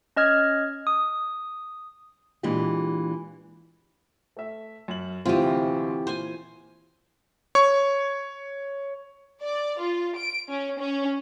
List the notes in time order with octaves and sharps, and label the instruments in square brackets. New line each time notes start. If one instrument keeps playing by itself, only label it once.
[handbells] C#4 D#5 F6 G#6
D#6
[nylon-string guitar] A#2 E3 G#3 D4 G4
[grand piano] A3 E5
F#2 F#7
[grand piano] D2 C3 G#3 [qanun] E3 F4 [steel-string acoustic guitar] C4 G4
[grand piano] A#2 [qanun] C5 G#5
[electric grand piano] C#5 C#6
[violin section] D5
F4
D7
C#4
C#4